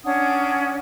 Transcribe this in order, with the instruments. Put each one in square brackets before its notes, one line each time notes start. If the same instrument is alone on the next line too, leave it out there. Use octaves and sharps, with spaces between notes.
[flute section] C#4 D4 F#5 D#6